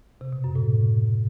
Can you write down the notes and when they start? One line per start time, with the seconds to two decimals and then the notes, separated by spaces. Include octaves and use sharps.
0.21 C3
0.33 B2
0.44 F#2
0.55 A2